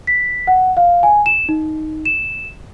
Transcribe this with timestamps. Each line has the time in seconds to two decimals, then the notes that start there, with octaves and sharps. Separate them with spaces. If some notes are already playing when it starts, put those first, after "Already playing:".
0.07 B6
0.47 F#5
0.77 F5
1.03 G#5
1.26 E7
1.49 D#4
2.05 E7